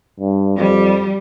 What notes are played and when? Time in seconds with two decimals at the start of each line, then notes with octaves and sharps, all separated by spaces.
0.20 G2
0.57 F2 G3